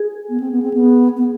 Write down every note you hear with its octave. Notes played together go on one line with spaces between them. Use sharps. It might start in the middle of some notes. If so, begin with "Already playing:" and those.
Already playing: G#4
B3
C4
B3
C4
B3
B3